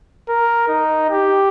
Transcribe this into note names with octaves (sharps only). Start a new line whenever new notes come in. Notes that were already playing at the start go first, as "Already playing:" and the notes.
A#4
D#4
G4